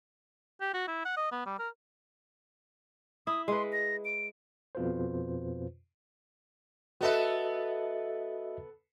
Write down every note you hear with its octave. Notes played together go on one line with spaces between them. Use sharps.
G4
F#4
E4
F#5
D#5
B3
G3
A#4
E4 D#6
G#3 B4 C6
A#6
D7
F2 B2 F4 B4 C5
B3 F#4 A4 B4 D#5 E5